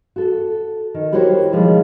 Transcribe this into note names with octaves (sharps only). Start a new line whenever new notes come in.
F#4 A4
D#3
E4 F#4 G4 A#4 C5 C#5
B2 D#3 F3 G3 G#3